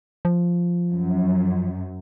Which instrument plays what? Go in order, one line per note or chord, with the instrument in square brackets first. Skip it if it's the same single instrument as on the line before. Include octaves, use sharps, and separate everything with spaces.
[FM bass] F3
[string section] F#2